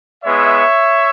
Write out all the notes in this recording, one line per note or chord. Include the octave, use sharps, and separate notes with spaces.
G#3 B3 E4 C#5 E5